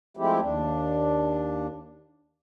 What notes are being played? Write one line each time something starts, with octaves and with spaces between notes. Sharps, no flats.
F3 G#3 A3 C4 E4 G4
D#2 D4